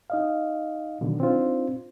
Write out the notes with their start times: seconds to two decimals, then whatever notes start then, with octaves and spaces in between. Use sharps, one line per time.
0.10 D#4 D#5 F5
1.01 B2 D3 D#3 F#3
1.20 C4 D4 D#4 F4 C5